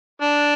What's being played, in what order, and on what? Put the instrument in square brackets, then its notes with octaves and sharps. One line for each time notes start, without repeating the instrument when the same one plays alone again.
[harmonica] D4